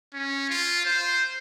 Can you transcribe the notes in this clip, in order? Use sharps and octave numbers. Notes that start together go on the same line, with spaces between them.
C#4
F4
C5